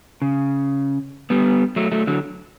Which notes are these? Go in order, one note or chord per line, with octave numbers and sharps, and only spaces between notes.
C#3
G3 B3
F#3 A3
F#3 A3
D3 F#3